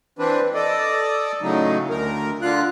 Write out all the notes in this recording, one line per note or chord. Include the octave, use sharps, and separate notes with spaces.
E3 C4 D4 B4
A4 D5 D#5
A2 C#3 F#3 D#4
D2 A#4
D3 F4 F#6